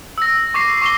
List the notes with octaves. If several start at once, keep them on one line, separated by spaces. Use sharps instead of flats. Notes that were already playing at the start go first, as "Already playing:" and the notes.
E6 A#6
C#6 D6 A#6 C7
C#6 D6 C7 G7